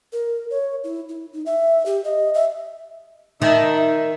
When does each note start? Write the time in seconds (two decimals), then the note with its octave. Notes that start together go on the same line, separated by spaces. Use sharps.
0.13 A#4
0.50 C#5
0.84 E4
1.09 E4
1.33 D#4
1.46 E5
1.86 G4
2.05 D#5
2.34 E5
3.42 D#3 D#4 E5 A5
3.74 E5